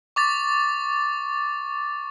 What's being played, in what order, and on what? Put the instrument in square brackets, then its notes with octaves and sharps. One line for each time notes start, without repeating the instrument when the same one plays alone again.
[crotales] C#6 D6 A6